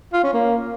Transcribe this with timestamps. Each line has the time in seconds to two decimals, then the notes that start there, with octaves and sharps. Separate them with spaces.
0.13 F4
0.23 C#4
0.34 A#3